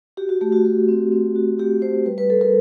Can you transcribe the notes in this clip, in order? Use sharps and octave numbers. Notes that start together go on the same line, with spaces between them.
F#4 G4
F#4
A3 G4
F#4
A3
C4
C4
F#4
F#4 G4
A3 C5
G3 B4
B4
G3 A4
A#4